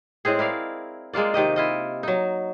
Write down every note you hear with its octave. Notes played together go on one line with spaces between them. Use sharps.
A2 G#3 C4 G#4
E4 A#4 D5 F5
G#3 A#3 F4 D5
C3 D#3 G4 D#5
E4 F4 D#5
F#3 D#4